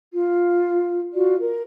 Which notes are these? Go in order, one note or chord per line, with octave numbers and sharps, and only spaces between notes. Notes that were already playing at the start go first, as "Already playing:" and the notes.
F4
F4 F#4 D5
A#4